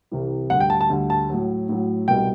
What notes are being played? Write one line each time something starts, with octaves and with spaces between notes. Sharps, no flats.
C2 C3 E3 G3
D2 D3 G3 F#5
G5
A5
A5
D2 D3 G3
A5
A2 F#3
A2 F#3
C2 B2 G3 G5